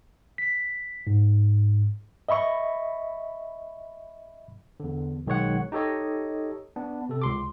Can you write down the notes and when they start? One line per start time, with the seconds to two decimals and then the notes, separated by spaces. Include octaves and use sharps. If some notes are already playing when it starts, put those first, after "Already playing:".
0.38 B6
1.07 G#2
2.29 D#5 E5 B5 C#6
4.80 E2 D3
5.27 B1 D#3 G#3 C#5 F#5
5.72 D#4 G4 A4 C#5 D#5
6.76 B3 D4
7.09 C3 A4
7.22 C#2 C6 D6